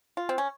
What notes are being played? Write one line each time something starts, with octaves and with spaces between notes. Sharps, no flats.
F4
C4
C#4